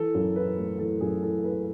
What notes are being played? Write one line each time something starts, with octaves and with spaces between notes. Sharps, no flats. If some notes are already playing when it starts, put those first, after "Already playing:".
Already playing: E3 A4
F#2
E4 B4
A3
E3 A4
F#2 G#4
E4 A4
A3 B4